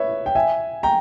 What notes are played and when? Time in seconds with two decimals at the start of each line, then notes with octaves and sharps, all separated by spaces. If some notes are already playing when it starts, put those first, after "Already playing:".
Already playing: B4 C#5 E5
0.26 G5
0.35 E5 G#5
0.83 G5 A#5